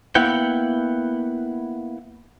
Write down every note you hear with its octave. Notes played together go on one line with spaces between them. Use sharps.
A#3 B3 E4 F#5 G5